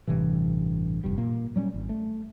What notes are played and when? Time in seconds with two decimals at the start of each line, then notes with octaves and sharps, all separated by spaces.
0.07 A1 G2 C3 E3
1.04 F1 G2 G3
1.18 A#2 A#3
1.56 F#3 G3 C#4
1.74 G#1
1.89 A3